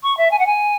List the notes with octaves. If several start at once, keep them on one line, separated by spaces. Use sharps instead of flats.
C#6
E5
G#5
F#5
G#5